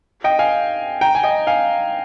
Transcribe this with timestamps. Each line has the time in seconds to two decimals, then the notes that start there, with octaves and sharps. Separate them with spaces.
0.24 D#5 G5
0.39 F5 G#5
1.01 G5 A#5
1.15 G#5
1.23 D#5 G5
1.47 F5 G#5